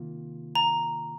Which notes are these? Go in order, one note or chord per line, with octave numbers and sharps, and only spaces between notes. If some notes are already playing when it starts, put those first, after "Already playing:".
Already playing: C3 D#3 A#3 F4
A#5